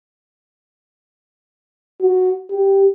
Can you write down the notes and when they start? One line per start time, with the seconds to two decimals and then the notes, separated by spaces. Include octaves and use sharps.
2.02 F#4
2.50 G4